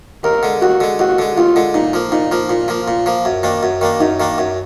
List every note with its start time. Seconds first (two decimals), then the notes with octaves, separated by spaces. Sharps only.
0.24 D#2 A#4
0.43 D3 G#3
0.62 D#2 F#4
0.80 D3 G#3
0.99 D#2 F#4
1.19 D3 G#3
1.37 D#2 F4
1.56 D3 G#3
1.74 A#2 D#4
1.94 F3 A#3
2.12 A#2 D#4
2.32 F3 A#3
2.49 A#2 F4
2.68 F3 A#3
2.88 A#2
3.06 F3 A#3
3.25 F#2
3.43 D#3 A#3 D4
3.63 F#2
3.81 D#3 A#3 D4
4.00 F#2 D#4
4.20 D#3 A#3 D4
4.38 F#2